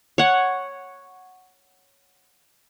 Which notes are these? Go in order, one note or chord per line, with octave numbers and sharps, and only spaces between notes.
C#5 F#5